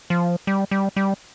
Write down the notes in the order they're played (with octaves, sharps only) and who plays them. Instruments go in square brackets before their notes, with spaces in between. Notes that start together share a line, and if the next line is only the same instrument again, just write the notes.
[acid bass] F3
G3
G3
G3